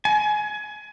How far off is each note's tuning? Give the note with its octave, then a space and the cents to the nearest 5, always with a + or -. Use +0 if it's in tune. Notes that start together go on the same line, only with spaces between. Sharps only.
G#5 +25